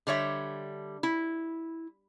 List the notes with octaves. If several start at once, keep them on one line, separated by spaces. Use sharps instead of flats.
D3 G3 C#5 E5
E4